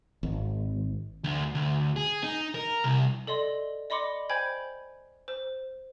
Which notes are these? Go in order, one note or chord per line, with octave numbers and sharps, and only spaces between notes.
G#1
D2
D2
G#4
D#4
A#4
C2
A4 D5 D#5 C6
D5 D#5 B5 C6 D6 C#7
C5 G5 G#5 B5 G6 G#6
C5